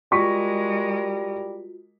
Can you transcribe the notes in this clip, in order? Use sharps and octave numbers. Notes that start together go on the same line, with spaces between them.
G3 G#3 F4 F#4 A#4 C#6 B6